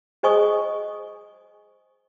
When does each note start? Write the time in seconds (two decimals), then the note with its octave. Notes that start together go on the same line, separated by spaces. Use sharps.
0.23 G#4 C5 D#5 G#5 C#6 D#6